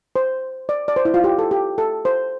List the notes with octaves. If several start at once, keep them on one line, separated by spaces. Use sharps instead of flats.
C5
D5
D5
C5
E4
F4
G4
A4
G4
A4
C5